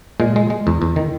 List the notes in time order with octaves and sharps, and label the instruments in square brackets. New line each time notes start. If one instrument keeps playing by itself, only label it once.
[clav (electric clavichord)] A#2 G#3
G#3
G#3
E2
E2
D#3